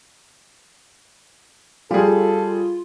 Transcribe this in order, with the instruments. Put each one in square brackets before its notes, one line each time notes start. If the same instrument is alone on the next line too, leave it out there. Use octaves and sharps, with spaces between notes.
[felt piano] G3 G#4 [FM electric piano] F4 [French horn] A4